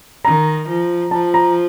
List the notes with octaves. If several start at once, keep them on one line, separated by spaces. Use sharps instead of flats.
D#3 A#5
F3
F3 A5
A#5